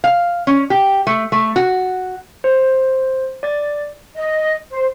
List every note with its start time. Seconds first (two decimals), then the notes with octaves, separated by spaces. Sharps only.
0.04 F5
0.47 C#4
0.70 G4
1.07 A3
1.32 A3
1.56 F#4
2.44 C5
3.43 D5 A6
4.16 D#5
4.72 C5